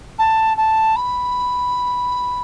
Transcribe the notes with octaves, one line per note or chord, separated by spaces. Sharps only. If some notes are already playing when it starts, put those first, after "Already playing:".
A5
A5
B5